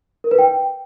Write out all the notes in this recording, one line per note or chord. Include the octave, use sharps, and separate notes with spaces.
A#4
B4
G5